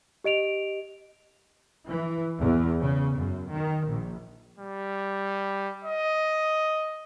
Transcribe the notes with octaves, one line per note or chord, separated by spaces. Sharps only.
G4 D#5 D7 F7
E3
E2
C#3
F#2
D#3
A#1
G3
D#5